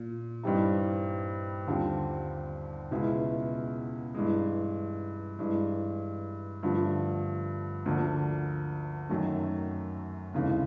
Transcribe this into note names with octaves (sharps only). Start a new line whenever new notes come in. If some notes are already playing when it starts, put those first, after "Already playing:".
Already playing: A#2
G2 E3 G3 C4 D#4
D#2 D3 G3 C4 F4
C#2 B2 G#3 B3 E4
G2 E3 G#3
G2 E3 G#3
G2 D3 F3 A3
D2 D3 F3 A#3
F#2 D#3 F#3 A3
F1 D#2 C#3 E3 G#3